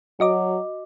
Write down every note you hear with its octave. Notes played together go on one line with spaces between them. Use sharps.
F#3 F#4 D#5 D6